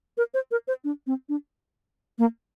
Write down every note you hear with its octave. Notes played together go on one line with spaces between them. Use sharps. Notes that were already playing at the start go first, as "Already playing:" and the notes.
A#4
C5
A#4
C5
D4
C4
D4
A#3